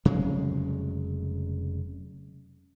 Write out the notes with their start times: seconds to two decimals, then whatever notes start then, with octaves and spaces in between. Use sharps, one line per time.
0.05 F1 C#3 F#3 G#3